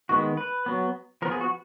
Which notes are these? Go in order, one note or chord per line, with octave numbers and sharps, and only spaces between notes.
D#3 G#3 B3 F#4
B4
F#3 B3
F3 B3 A#4
G#4
F#4